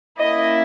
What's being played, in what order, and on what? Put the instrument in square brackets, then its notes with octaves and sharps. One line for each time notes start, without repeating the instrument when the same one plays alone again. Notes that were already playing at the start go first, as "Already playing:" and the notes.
[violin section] A#3 C#4 E4 D#5